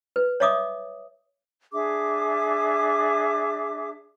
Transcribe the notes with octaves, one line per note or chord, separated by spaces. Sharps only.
B4
C#5 D#5 E5 D6 D#6
D4 G#4 E5 D6